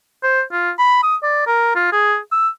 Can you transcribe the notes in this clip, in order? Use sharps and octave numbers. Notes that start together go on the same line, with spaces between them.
C5
F4
B5
D#6
D5
A#4
F4
G#4
E6